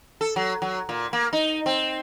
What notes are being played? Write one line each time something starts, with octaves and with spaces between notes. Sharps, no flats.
A4
F#3
F#3
A#2
A#3
D#4
C4